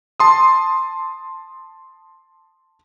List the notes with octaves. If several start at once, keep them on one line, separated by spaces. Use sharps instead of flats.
A5 C6 D#6